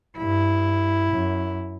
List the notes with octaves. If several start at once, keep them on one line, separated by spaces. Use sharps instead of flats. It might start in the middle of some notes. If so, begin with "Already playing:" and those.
G2 E4
F#2